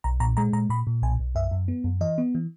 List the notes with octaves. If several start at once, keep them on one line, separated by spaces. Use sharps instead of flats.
B1 A#5
A#2 A#5
G#3 A#5
A#2 A#5
A#2 B5
A#2
B1 G#5
B1
F#2 E5
F#2
B3
F#2
E3 D#5
B3
E3